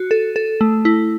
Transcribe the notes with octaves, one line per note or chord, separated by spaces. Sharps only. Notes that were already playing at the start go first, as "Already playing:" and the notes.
Already playing: F#4
A4
A4
A3
E4